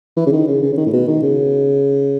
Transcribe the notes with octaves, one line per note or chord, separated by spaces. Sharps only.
E3
C#3
D#3
C#3
C#3
C#3
D#3
A2
B2
D#3
C#3